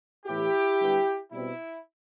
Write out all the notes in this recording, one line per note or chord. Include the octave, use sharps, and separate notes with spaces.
A2 E3 B3 E4 G4
D3 G3 B3
B2 G3 C4 E4